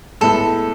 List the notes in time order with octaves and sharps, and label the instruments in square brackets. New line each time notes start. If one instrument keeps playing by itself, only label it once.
[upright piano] A2 G#3 B3 E4 [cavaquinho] A4